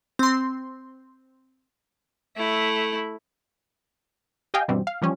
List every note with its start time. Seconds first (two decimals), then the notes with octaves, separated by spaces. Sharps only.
0.19 C4 C6
2.36 A3 E4
4.54 G4 D#5 F5 G5 G#5
4.68 G2 B2 E3 G3 C4
4.87 F5
5.02 E3 F3 G3 C#4